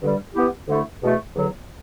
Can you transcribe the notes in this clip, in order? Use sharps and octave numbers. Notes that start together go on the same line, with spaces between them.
G2 D3 G3
E3 B3 E4 G4
D2 D3 A3 E4
E2 B2 A3
E2 D3 F#3